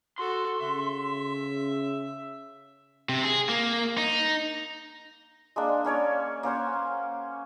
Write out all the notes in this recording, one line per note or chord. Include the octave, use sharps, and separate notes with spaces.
F#4 A4 C6
C#3 E5
C3
G#4
A#3
D#4
G#3 A#3 D4
A#3 C#4 C#5 D5
A#3 C#4 C5 F#5